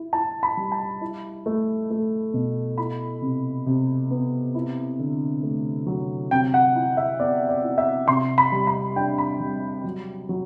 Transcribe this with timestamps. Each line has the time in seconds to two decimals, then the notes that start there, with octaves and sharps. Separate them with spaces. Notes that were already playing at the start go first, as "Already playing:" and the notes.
Already playing: E4
0.13 E4 A5
0.43 B5
0.57 G3
0.72 A5
1.01 E4
1.46 A3
1.90 A3
2.34 B2
2.78 E4 B5
3.22 C3
3.66 C3
4.11 B3
4.55 E4
4.99 D3
5.43 A3
5.87 F#3
6.31 C3 G5
6.54 F#5
6.75 E4
6.97 E5
7.20 B3 D5
7.49 D5
7.64 E4
7.78 E5
8.08 C3 C6
8.38 B5
8.52 G3
8.67 B5
8.96 D4 G5
9.18 B5
9.40 G3
9.84 F#3
10.29 F#3